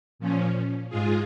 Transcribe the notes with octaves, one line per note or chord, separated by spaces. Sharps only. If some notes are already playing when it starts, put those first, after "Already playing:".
A#2 F3 C#4
G#2 G#3 F4 G#4